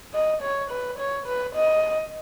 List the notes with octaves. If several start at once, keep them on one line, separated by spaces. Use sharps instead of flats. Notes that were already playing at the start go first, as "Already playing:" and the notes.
D#5
C#5
B4
C#5
B4
D#5